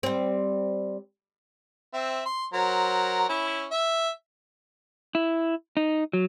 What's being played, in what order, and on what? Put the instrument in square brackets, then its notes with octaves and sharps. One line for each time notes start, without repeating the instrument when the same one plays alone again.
[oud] G3 C4
[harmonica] C4 E5
C6
F#3 A#4 C5
C#4 E4
E5
[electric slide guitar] E4
D#4
F#3